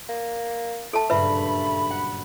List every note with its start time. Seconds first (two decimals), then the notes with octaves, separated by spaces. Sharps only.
0.09 A#3
0.93 A3 A4 A5
1.10 F#1 G2 A#2 B4 E5 B5
1.91 F#5